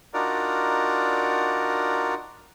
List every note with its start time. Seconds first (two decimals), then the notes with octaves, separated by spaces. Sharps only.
0.14 D4 D#4 F4 F#4 A#4 D5